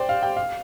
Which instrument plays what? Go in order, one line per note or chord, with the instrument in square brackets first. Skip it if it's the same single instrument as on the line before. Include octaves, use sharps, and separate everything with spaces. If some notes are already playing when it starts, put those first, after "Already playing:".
Already playing: [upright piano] C5 D5 G5
F5
G5
F5